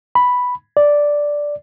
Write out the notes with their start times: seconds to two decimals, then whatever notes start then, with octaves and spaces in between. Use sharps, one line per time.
0.15 B5
0.77 D5